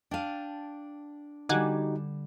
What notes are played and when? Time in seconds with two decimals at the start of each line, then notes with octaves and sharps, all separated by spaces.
0.11 D4 F5 G5 A5 D#7
1.49 D3 G3 D#4 F#4 G4 F#5 G#5 D6